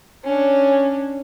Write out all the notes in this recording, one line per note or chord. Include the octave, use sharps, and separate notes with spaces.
C#4 D4